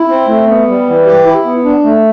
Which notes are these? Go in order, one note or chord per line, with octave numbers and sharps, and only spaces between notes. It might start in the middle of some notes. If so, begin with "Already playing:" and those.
Already playing: E4
C4
A3
B3
G3
E3
G4
E4
B3
D4
A3